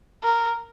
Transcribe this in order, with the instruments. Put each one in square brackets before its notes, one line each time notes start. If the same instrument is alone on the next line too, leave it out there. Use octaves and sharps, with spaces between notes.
[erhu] A#4